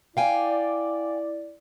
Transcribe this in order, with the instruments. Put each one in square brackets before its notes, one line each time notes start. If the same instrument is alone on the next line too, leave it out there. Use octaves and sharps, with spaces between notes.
[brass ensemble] E4 D5 [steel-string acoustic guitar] F5 G5 G#5